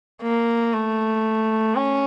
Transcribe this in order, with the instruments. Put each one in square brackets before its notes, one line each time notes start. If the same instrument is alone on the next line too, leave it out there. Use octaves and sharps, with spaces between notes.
[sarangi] A#3
A3
C#4